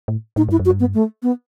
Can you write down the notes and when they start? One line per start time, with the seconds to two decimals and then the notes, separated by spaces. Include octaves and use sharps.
0.08 A2
0.36 A2 D#4
0.49 G2 E4
0.59 F#2
0.65 F#4
0.70 G2
0.80 B3
0.94 A3
1.23 B3